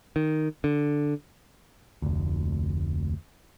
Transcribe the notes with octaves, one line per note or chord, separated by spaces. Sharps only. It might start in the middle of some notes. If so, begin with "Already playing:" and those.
D#3
D3
F1 D2